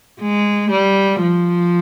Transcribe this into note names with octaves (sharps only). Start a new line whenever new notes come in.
G#3
G3
F3